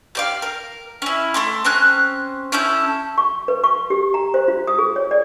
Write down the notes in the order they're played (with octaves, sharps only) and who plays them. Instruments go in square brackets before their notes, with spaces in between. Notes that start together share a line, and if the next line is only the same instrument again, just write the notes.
[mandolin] G4 D5 F5
A#4
C#4 E4
A3 C6 D6
C4 C#4 F#6
C#4 E4 A4 G6
[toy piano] C#6
B4
C#6
G4
A#5
C5
F4
D#6
G#4
C#5
D5